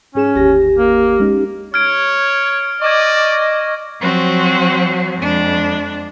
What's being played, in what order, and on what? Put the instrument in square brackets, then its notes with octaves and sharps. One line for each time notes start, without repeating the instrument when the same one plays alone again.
[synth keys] G#2 G#4 E7 [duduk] C#4
[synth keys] G1 D#2 A#6 [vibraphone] G4
[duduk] A#3
[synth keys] G#3 C#4 D#4
[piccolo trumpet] C#5 [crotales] F6 G#6 D7
[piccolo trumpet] D5 [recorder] D#5 [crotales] C#6 D6 G#6
[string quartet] F3 F#3 C4 F#4
F2 G#3 D4